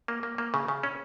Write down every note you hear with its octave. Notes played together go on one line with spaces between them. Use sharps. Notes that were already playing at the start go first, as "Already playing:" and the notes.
A#3
A#3
A#3
C#3
C#3
C#4